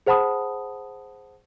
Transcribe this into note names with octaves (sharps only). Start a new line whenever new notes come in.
G#4 C5 F#5 A5 B5 D#6